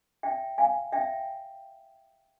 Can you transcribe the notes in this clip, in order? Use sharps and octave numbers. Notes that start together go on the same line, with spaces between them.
E5 G5
F5 G#5
E5 G5